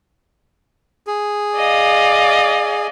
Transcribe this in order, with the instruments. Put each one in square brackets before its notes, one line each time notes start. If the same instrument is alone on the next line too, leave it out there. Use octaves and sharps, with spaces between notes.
[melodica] G#4
[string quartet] D5 D#5 F5